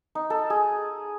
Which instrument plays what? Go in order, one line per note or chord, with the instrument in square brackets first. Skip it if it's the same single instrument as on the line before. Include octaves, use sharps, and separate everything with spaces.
[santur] D#4
A4
G#4